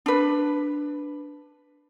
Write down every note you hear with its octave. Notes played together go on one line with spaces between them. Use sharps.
D4 B4